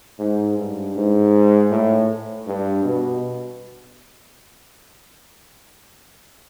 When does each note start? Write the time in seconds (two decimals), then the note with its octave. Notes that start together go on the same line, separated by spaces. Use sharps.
0.19 G#2
0.58 G2
0.95 G#2
1.71 A2
2.47 G2
2.84 B2